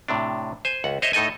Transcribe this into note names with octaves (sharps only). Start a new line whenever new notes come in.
A2 C3 D4
C5 G#5
C#2 F#5
C5 C#5 D#5 E5
A2 D#4 A4 D#5 G#5